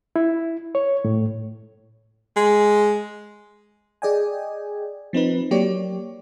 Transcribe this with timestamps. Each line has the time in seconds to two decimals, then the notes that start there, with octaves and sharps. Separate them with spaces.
0.16 E4
0.75 C#5
1.05 A2
2.37 G#3
4.02 G#4 D5 D#5 G5 G#5
5.13 F3 C4 D#4 B4
5.51 F#3 A#3 G4 C#5 D5